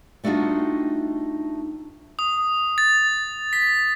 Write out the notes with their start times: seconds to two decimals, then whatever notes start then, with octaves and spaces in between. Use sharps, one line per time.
0.24 G3 A3 D4 D#4 F4 F#4
2.19 D#6
2.78 A6
3.53 B6